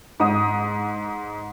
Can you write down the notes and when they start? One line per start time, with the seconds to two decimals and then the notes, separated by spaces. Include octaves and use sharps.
0.20 G#2 D#6